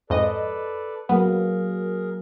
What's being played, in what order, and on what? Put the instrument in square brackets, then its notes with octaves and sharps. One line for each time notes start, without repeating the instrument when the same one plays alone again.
[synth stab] F2 G#2 D#5 [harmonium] A4 B4 D5
[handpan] F#3 A#3 [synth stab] B3 [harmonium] G#4 A#4